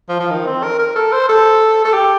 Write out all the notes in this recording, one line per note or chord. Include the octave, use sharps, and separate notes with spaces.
F3
F3
D#3
C4
A#4
A#4
A4
C5
A4
A4
G4